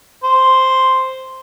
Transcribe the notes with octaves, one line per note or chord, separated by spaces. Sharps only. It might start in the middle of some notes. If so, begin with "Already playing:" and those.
C5